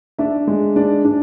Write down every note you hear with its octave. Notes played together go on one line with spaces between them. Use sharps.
D4 E5
G#3
D4
D4